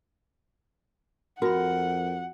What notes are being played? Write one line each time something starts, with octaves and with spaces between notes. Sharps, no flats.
F2 F#4 A#4 F#5 B5